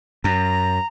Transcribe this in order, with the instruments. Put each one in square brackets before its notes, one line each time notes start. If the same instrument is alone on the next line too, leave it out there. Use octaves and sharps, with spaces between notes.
[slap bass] F#2 [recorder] A#5